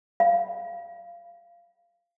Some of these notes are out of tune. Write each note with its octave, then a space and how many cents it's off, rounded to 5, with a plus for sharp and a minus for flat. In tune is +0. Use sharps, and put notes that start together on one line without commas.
F5 -20